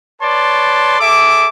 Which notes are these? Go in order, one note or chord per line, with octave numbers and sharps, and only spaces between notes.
B4 C#5 D5 A5 C6
G#4 A4 E5 D6